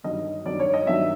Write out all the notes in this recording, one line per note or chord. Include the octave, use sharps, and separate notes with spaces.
G2 D#3 F#3 D#5
G2 D#3 F#3 D5
C#5
D#5
G2 D#3 F#3 E5